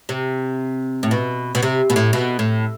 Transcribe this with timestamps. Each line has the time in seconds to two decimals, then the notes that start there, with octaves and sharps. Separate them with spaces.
0.09 C3
1.03 A2
1.11 B2
1.55 B2
1.62 C3
1.90 B2
1.96 A2
2.13 B2
2.39 A2